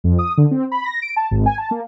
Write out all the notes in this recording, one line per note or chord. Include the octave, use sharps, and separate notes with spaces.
F2
D#6
D3
C4
B5
A#6
D7
A5
G#1
G#5
A5
A#3